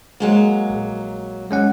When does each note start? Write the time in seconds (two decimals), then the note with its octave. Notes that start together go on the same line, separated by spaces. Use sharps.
0.20 F#3 G#3 A#3
0.70 A#1
1.51 G#3 C#4 F#5